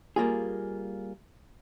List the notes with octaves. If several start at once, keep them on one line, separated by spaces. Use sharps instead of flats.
G3 A#3 F4 G#4